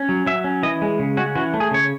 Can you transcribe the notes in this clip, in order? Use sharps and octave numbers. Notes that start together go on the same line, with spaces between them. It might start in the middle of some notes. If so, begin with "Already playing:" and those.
Already playing: C#4
F#3
F#3 E5
C#4
E3 D#5
G#3
C#3
C#4 F#4
E3 F#4
A3
G#4
C#3 C#5